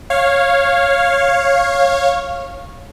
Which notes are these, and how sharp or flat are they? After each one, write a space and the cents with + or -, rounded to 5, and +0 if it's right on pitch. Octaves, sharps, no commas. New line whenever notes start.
C#5 -15 F5 +0